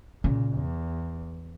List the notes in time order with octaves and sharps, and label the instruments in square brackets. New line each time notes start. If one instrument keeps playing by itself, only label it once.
[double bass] A#2 [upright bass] C#3
[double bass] E2